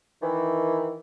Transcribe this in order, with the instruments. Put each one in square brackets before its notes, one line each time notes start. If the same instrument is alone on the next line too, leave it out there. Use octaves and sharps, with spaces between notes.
[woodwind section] D#3 E3